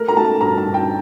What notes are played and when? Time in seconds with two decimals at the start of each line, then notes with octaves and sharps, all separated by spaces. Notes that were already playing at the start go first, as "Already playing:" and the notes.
Already playing: A3 A#4
0.08 A#5
0.16 A3 A5
0.41 G2 A#5
0.58 A5
0.67 G2
0.74 G5